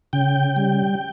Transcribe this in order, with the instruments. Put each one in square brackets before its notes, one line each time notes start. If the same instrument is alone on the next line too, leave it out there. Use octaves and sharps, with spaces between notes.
[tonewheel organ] C#3 G5
G3